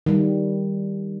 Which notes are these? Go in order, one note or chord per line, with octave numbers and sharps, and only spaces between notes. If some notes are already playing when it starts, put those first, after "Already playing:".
D#3 G3